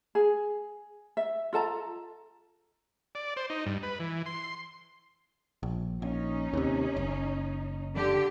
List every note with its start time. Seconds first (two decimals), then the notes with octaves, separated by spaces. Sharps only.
0.15 G#4
1.17 E5
1.53 F4 A4 A5 A#5
3.15 D5
3.37 C5
3.50 D#4
3.66 G2
3.83 B4
4.00 E3
4.26 C6
5.63 A#1
6.02 A#1 C#4 D#4
6.53 D#2 C3
6.97 F#1
7.96 D3 G4